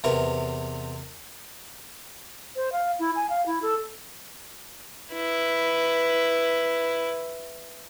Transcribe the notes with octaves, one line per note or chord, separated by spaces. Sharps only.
E2 C3 A#4 B4 C#6
C5
F5
E4
G#5
F5
E4
A4
E4 B4